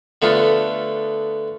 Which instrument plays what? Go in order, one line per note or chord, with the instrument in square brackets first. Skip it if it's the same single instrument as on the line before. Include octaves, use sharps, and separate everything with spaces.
[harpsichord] D3 A3 B3 F4